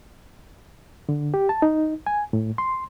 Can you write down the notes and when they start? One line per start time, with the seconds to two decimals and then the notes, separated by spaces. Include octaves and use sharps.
1.09 D3
1.34 G4
1.49 A5
1.62 D#4
2.07 G#5
2.33 A2
2.58 C6